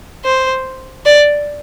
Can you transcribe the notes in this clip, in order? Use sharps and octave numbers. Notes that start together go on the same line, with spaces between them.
C5
D5